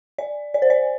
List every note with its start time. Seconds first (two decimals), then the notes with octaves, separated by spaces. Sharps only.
0.18 D5
0.54 D5
0.62 C5
0.70 D5